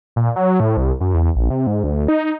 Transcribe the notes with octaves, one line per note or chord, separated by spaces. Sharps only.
A#2
F#3
A2
C2
F#2
E2
A#1
C3
G#2
D2
D#4